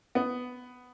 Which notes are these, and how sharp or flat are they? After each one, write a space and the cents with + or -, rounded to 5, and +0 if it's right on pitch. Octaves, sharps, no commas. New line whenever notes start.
B3 +10